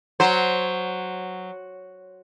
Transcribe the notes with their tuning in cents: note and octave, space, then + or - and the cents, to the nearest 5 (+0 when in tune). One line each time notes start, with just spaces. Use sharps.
F#3 +0 C5 +0